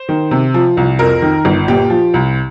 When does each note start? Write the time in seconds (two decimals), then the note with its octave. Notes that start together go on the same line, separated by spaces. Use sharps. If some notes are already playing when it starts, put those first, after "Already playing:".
Already playing: C5
0.09 D#3
0.31 C3
0.54 F3
0.77 C2
0.99 F2 A#4
1.22 D#3
1.45 G1
1.68 A#2 G4
1.90 F3
2.14 C2